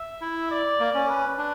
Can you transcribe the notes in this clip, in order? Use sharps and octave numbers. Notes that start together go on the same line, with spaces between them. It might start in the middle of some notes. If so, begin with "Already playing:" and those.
Already playing: E5
E4
D5
A#3
C#4
B4
D4